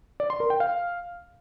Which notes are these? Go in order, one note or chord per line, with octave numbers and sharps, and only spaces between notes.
D5
C6
A#4
G5
F5